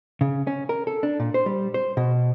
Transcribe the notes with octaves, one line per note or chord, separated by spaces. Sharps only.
C#3
C#4
A#4
A4
D4
A#2
C5
G3
C5
B2